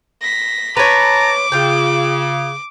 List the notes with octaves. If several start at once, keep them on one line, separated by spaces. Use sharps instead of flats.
A#6 B6
B4 C#5 A5 A#5 D6
C#3 F4 G5